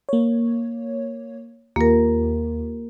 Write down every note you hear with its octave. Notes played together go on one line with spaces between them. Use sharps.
A#3 C#5
D#2 A#3 F4 G4 A#4